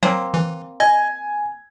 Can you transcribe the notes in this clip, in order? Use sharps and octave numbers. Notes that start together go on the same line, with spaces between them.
F#3 A#3 C4
E3
D#5 G#5 G#6